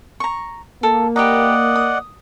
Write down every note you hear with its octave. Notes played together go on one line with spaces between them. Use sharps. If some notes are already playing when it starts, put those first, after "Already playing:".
A#5 C#6
A#3 A4
G4 B4 D5 D#5 F#5 A#5
D#6